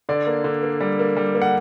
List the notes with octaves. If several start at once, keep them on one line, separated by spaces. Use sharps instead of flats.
D3 D5
A#3
D3
A#3
G3
A#3
G3
A#3
F#5